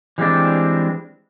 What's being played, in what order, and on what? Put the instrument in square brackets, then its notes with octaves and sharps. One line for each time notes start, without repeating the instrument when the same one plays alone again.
[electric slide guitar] E3 G3 G#3 A#3 C4 D4